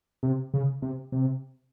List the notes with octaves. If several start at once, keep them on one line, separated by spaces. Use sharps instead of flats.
C3
C#3
C3
C3